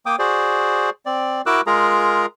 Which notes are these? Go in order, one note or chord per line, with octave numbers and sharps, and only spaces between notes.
A#3 G5 D6 D#6
F#4 G#4 C5 D5
C4 D5
E4 F#4 A#4 D6 E6 F#6
G#3 F4 G#4 A#4 A#5